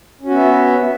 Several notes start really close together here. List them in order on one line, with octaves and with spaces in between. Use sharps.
C#4 F#4 B3 E5